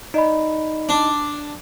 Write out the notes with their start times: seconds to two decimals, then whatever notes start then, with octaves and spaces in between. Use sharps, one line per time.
0.14 D#4 D5 D#5 B5
0.89 D4